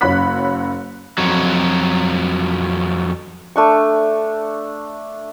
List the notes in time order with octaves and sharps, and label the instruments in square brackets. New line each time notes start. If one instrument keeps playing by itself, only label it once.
[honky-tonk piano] F#1 F#2 C#5 B5 F#6 B6
[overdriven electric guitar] F2 F#3
[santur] A3 D4 C#6